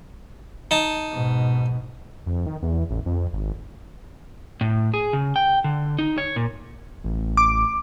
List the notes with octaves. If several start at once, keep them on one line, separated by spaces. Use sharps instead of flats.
D#4 A5
G#2 B2
F2
D#3
E2
A1
F2
G#1
A2
G#4
C#3
G5
D3
D#4
C#5
A#2
A1
D6